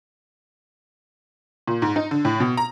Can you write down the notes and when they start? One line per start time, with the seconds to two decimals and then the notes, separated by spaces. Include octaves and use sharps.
1.68 A#2
1.82 G#2
1.96 D#4
2.11 D3
2.25 A2
2.40 B2
2.57 A#5